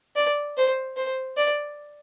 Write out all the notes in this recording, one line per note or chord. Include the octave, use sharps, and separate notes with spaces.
D5
C5
C5
D5